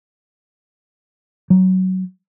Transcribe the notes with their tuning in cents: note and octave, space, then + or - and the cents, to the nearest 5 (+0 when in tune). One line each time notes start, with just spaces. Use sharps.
F#3 +15